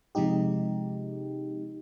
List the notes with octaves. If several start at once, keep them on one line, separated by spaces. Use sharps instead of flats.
C3 F3 G#3 D#4 G4